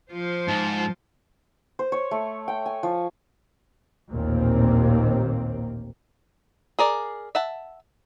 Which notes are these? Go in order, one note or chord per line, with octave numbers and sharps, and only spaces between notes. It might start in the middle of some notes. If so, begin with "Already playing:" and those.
F3 F4 C5
G#2 A5
C5
C#5
A3
G5
G#5
F3
A1 D#2 A#2 A#3 C4
G#4 A#4 D5
E5 F#5 A5